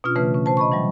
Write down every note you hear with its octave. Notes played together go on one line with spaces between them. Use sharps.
B2 C#4 D4 F4 F6
C#3 E3 A3 B4
C#4
C3 C5 A5
D#5 B5 C#6
E3 F#3 G3